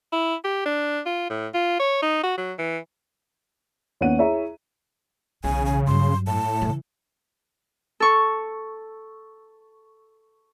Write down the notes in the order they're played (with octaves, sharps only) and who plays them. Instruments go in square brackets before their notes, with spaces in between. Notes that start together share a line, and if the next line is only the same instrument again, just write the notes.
[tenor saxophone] E4
G4
D4
F4
A2
F4
C#5
D#4
F#4
F#3
E3
[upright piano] D#2 B3 C#4 F#5 D#7
E4 G#4 C#5 E5 A#5
[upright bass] B1 E3 [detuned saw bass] C#3 [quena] G#5
[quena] G#5
[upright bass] G2 F#3 [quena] C6
[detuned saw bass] A2 [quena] A5
[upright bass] C#3 E3
[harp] A4 C#6